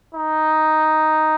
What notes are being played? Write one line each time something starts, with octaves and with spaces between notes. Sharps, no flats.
D#4